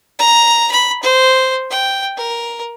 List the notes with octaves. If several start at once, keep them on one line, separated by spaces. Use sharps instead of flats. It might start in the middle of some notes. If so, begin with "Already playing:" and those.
A#5
B5
C5
G5
A#4